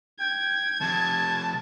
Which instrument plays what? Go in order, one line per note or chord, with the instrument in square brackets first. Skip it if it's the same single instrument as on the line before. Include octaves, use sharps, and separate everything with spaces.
[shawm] G5 [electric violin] G#6
[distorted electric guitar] C3 F3 [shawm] A5